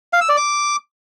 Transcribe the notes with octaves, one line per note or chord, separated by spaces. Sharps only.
F5
E6
D5
D6